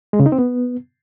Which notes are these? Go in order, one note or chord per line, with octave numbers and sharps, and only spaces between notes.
G#3
C#3
D#4
C4
B3